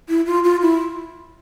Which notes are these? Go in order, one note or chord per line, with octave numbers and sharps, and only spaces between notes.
E4
F4
F4
E4